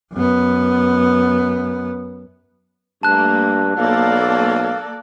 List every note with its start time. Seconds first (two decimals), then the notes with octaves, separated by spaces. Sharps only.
0.13 F#2 B3
3.03 G2 A3 A#3 A5 F#6
3.78 B1 A#3 A4 D5 F5